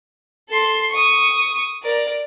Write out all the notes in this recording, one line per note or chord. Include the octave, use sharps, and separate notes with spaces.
A4 C6
C#6 D#6
A#4 D5